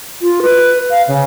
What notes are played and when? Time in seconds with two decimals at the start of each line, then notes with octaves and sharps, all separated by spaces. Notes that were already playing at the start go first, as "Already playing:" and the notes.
0.22 F4
0.43 B4
0.91 F5
1.08 C#3